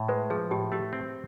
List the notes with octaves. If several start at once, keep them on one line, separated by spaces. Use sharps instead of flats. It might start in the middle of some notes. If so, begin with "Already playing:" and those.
Already playing: A2
G#3 B4
F3 G#4
A2 G4
A3 G4
C4